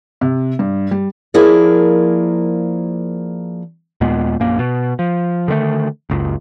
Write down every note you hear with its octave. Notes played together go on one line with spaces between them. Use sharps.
C3
G2
G3
F3 A#3 E4 G#4 A#4 D5
D#2 A#2 G#3 B3
A#1 F#2 A#3
B2
F3
D3 D#3 G#3 A3
F#1 C#2